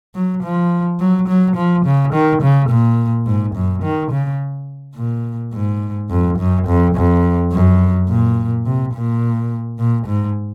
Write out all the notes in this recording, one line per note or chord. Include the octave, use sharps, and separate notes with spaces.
F#3
F3
F#3
F#3
F3
C#3
D#3
C#3
A#2
G#2
F#2
D#3
C#3
A#2
G#2
F2
F#2
F2
F2
F#2
A#2
C3
A#2
A#2
G#2